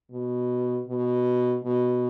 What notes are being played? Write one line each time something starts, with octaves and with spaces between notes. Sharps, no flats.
B2
B2
B2